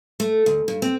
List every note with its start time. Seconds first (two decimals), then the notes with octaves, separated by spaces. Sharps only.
0.20 A3
0.46 D2
0.68 G2
0.82 C4